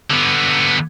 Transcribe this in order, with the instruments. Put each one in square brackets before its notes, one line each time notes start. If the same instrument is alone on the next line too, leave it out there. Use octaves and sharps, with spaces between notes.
[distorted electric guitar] D3 B3